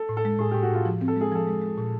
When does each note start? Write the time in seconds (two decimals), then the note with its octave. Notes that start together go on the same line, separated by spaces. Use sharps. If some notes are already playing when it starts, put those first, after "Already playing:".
Already playing: A4
0.09 A2
0.17 A4
0.25 G#3
0.39 A2 G#4
0.51 A2 G4
0.63 F#4
0.71 A2 F4
0.85 F3
1.01 C4
1.08 A4
1.16 G#3 G#4
1.32 F3 A4
1.47 G#3
1.62 G#3
1.78 A#2